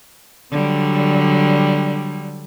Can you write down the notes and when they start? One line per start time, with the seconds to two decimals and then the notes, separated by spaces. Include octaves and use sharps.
0.51 D3 F#3 G3